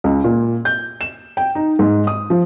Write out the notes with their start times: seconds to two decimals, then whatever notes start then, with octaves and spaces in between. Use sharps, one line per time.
0.04 C#2
0.24 A#2
0.65 G6
1.01 E7
1.37 G5
1.55 D#4
1.79 G#2
2.07 D#6
2.30 F3